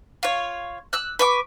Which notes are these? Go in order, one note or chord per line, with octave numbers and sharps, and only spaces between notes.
F4 C#5
E6 F#6
B4 C#6 D6